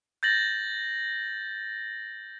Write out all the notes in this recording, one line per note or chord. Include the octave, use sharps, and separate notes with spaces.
G6 A6 A#6 F#7